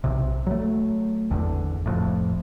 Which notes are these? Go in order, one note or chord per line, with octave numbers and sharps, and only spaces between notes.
B1 C3
F#3 A3
G#1 E2 D3
F1 F2 A2